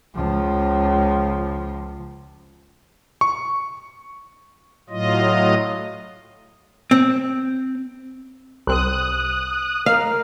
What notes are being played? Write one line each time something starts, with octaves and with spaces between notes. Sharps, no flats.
C#2 F3
C#6
A2 F#3 F4 D#5
C4
C2 C4 D#6 F#6
A#4 F5